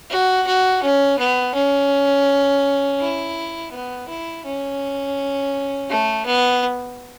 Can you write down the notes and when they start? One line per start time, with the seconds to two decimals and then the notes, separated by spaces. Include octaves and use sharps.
0.10 F#4
0.46 F#4
0.83 C#4
1.18 B3
1.54 C#4
3.00 E4
3.72 B3
4.08 E4
4.45 C#4
5.90 A3
6.26 B3